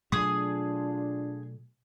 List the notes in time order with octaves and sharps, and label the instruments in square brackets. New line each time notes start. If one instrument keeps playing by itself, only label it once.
[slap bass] B2 F#3 A3 [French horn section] D4 F4 [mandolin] G#4 D#6